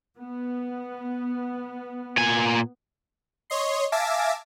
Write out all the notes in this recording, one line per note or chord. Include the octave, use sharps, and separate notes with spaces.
B3
A#2 G#5
C#5 D#5 C6
E5 F5 G#5 A5 D6 A#6